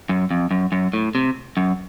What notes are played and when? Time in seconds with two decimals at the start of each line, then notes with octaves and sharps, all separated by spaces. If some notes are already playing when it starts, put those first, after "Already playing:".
0.09 F#2
0.31 F2
0.51 F#2
0.72 F#2
0.93 A2
1.15 C3
1.57 F#2